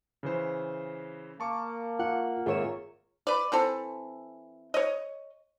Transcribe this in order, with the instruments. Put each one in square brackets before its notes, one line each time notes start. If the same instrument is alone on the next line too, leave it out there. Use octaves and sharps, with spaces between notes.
[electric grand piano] C#3 E3 C5
[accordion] A#3 [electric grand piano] A5 C#6 D6
[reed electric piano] F4 [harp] F#5
[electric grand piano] G#1 E5 [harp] F4 C#5 E7 [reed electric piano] G#4 A#4
[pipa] B4 D5
E3 C4 A4
C#5 D#5